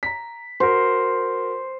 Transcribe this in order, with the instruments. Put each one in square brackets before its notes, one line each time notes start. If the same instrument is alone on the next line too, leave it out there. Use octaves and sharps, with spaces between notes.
[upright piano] A#5 B6
[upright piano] F#4 A#4 [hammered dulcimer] C5